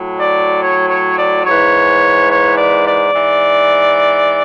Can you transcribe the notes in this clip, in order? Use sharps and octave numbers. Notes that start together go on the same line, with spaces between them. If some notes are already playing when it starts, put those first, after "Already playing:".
Already playing: A2 F#3
D5
C#5
C#5
D5
G#2 E3 C#5
C#5
D5
D5
G#2 E3